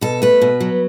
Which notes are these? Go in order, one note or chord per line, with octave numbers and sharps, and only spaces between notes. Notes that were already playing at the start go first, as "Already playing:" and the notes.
B2 A4
A3 B4
B2
F#3